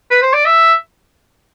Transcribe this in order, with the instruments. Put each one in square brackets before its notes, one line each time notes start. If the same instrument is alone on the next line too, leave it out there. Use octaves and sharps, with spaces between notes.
[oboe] B4
C5
D5
E5